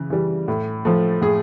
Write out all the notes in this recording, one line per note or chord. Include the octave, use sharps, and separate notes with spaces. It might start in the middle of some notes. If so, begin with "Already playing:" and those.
Already playing: C#3 E3
E3 G3
A2
F3 A3
A2 G#4